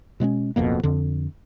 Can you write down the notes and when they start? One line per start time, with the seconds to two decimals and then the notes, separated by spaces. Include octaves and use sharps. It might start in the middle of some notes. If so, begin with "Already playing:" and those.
0.20 B2 G#3 B3 C#4
0.56 D1 F2 B2 A#3
0.83 F2 D3